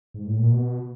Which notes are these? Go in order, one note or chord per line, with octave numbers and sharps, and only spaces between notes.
G#2
A2
A#2
B2